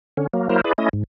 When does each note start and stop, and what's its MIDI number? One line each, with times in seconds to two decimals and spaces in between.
0.17 0.27 50
0.17 0.27 61
0.33 0.49 54
0.33 0.49 58
0.49 0.61 54
0.49 0.61 58
0.49 0.61 64
0.49 0.61 70
0.49 0.61 72
0.64 0.73 64
0.64 0.73 68
0.64 0.73 71
0.64 0.73 74
0.78 0.89 57
0.78 0.89 61
0.78 0.89 64
0.78 0.89 75
0.93 1.04 44